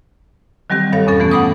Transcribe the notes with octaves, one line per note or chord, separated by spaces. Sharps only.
D#3 F#3 G3 C4 G4
G2 A4 C#5 F5
E2 G2 B2 C#4 A4 A6
F2 E3 A3 B3
F#5 G5 B5 D6 D#6